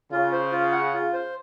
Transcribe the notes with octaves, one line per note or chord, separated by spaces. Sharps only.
C#3 F4
C5
F4
F#5
F4
C5